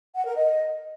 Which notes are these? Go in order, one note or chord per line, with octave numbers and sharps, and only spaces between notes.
F#5
A#4
D#5